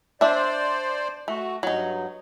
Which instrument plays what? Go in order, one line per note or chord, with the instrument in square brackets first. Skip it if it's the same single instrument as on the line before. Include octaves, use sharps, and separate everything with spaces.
[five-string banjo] D4 E5 [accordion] C5 D5
[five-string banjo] A3 [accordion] F#4
[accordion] G2 [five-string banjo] F#3 D#4